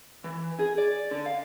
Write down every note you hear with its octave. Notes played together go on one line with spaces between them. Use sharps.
E3
G#4
D5
D3
F5